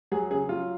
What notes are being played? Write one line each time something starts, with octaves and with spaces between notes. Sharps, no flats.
F#3 G#4
C#3 G#4
F#3 F4